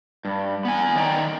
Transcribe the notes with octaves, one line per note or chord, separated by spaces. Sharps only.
G2
B3 G#5
D#3 C#5 D5 G5 A#5